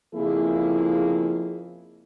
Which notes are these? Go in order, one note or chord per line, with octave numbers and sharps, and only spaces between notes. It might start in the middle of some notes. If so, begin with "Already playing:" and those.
F2 C#3 F3 A#3 E4 G#4